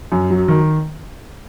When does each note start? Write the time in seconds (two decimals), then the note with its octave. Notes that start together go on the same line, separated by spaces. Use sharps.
0.12 F#2
0.30 F#3
0.48 D#3